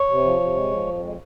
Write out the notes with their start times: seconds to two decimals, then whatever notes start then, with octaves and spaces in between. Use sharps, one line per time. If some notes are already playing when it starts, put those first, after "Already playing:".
Already playing: C#5
0.09 C3
0.24 F3
0.40 C3
0.56 G#3
0.71 F3
0.87 F2
1.03 G#3